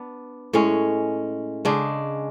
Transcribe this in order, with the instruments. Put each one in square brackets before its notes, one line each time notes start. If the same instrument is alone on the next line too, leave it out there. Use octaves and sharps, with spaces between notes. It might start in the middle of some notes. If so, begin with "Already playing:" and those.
Already playing: [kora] B3 D4
A2 G#3 C#4
C#3 G#3 D4